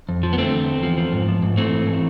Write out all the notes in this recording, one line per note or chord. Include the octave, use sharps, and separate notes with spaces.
F2
F3
B3
D3 A3 C4
E2
E2
F3
F3
G#2
F3
G#2
E3 A3 C4
G#2
E3